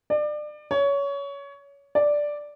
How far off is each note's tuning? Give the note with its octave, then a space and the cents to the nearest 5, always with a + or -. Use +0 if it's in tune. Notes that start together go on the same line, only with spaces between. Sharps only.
D5 +30
C#5 +20
D5 +0